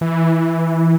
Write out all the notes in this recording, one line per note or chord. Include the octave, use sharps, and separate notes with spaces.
E3